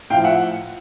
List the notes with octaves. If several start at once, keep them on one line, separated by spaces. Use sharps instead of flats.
A2 F3 F5 G5
E5 F#5